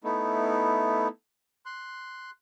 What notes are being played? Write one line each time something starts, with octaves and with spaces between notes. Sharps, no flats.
A3 B3 D#4 E4
C6 F#6